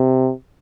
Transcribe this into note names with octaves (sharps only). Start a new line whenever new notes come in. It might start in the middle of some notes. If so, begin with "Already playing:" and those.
Already playing: C3